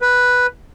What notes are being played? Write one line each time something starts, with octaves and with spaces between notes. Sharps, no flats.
B4